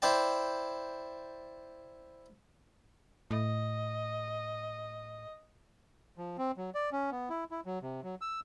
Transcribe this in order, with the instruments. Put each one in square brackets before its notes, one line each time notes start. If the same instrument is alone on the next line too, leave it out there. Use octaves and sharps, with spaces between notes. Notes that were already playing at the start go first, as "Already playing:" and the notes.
[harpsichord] E4 C5 D5 G5 A5
[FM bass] A2 [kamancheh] D#5
[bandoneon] F3
C4
F#3
D5
C#4
B3
E4
E4
F#3
C3
F#3
E6